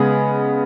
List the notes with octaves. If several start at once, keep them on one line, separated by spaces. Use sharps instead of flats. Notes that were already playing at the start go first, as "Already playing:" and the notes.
Already playing: C#3 G#3 B3 G#4